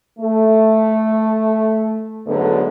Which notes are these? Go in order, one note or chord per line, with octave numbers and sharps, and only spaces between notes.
A3
D2 G#2 D3 F#3 A3 B3